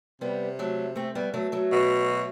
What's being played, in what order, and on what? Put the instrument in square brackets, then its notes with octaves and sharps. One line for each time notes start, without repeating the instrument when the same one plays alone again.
[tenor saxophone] C3 [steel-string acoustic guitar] G3 B3
[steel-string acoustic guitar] F#3 A3
A3 C4
G3 B3
F#3 A3
F#3 A3
[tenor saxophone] B2